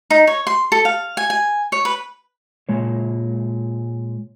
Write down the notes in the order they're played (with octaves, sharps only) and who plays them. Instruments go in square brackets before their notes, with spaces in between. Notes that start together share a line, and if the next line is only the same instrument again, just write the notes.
[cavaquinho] D#4
C#5
C6
A4
F5
G#5
G#5
C#5
B4
[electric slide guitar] A#2 G#3 C#5